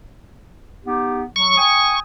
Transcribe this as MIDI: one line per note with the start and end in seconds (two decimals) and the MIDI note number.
0.85 1.23 59
0.85 1.23 63
0.85 1.23 67
1.36 1.56 54
1.36 2.00 85
1.57 1.96 79
1.57 1.96 80
1.57 1.96 87